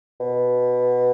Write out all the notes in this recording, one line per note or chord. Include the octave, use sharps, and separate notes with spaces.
B2